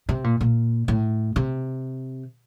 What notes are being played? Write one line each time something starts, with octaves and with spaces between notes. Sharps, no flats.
C3
A#2
A#2
A2
C3